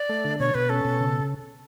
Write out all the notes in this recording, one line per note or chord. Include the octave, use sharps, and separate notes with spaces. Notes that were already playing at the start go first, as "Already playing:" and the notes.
Already playing: D5
A3
D3
B2 C#5
B2 B4
C#4 A4
B2
C#3